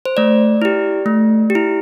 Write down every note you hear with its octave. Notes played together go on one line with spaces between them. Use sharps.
C5
A3 D5
E4 G4
A3
G4
E4